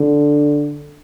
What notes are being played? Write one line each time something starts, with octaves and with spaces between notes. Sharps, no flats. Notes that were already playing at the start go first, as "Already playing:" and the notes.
Already playing: D3